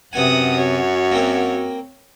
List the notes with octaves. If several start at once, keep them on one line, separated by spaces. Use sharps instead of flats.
F#2 C3 B3 F#5 G#5 D#6
F#4 C#5
A#3 C4 A#4